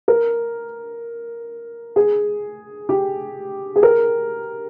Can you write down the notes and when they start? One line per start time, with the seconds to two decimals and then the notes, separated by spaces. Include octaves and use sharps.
0.08 A#4
1.96 G#4
2.89 G4
3.76 G#4
3.83 A#4